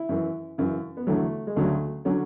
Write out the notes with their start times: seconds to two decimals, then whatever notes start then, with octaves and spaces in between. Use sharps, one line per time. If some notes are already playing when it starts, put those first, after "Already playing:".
Already playing: E4
0.09 F#2 E3
0.58 F#2 C#3 E3
0.97 B3
1.07 E2 D3 F#3 A3
1.47 G#3
1.56 D2 C#3 F#3 A3
2.05 D3 F#3 C#4